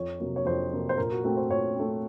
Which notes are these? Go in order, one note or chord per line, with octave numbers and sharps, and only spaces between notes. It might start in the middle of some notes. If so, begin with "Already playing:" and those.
Already playing: F2 C#5
C3 F#3 A#3
C#5
F2 C5
C3 F#3 A#3
C5
A#2 A#4
F#4
A3 C4 F#4
C5
A#2 C#5
A3 C4